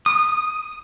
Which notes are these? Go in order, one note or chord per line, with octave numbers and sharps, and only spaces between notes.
D#6